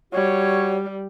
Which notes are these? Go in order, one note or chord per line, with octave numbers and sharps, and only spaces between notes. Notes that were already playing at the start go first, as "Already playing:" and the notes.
G3 F#4 C#5